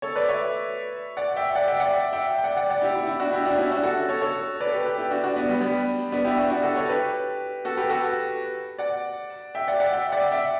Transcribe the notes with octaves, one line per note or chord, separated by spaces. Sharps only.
A4 C#5
B4 D5
C#5 E5
D5 F#5
E5 G5
D5 F#5
E5 G5
D5 F#5
E5 G5
G5
D5 F#5
D5 F#5
D5 F#5
E4 G4
E4 G4
E4 G4
D4 F#4
E4 G4
D4 F#4
C#4 E4
D4 F#4
F#4 A4
A4 C#5
A4 C#5
B4 D5
A4
G4 B4
G4 B4
E4 G4
D4 F#4
D4 F#4
B3 D4
G3 B3
G3 B3
B3 D4
E4 G4
D4 F#4
D4 F#4
F#4 A4
A4 C#5
G4 B4
F#4 A4
G4 B4
F#4 A4
D5 F#5
E5 G5
D5 F#5
D5 F#5
E5 G5
D5 F#5
E5 G5